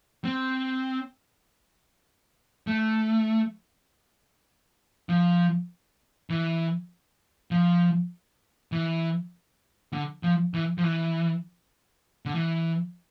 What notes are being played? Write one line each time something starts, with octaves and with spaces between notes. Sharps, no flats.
C4
A3
F3
E3
F3
E3
D3
F3
E3
F3
E3
D3
E3